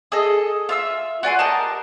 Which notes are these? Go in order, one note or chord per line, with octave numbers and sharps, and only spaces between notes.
G#4 A4 D#5
F4 E5 E6
F#4 D5 G#5 C6
G4 A#4 D#5 A5